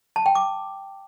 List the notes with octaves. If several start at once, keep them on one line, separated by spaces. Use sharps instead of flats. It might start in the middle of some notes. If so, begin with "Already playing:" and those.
A5
G5
D6